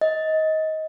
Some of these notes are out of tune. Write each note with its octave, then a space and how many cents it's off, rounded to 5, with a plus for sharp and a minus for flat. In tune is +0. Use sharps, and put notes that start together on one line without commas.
D#5 +20